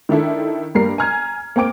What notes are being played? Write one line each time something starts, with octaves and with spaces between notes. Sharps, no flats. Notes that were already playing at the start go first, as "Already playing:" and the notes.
D#3 D4 E4 A4
G2 G3 A#3 D4 A#4 C7
G#5 A#5 F6 G#6
A#3 C4 G5 D6 D7